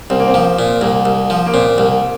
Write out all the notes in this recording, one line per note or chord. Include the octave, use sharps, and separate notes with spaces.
C2 C4
A#3
C4
F3
A#2
C2 A#3
C2
F3
A#3
A#2 C4
C2